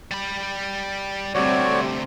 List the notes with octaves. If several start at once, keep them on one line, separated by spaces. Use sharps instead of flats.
G3 B5
D2 C3 G3 A3 C4 F#4 C#5 D5